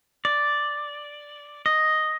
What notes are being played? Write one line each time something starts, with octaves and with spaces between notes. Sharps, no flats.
D5
D#5